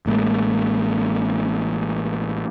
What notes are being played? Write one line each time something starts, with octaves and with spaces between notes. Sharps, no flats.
A1 A2 G#3 A#3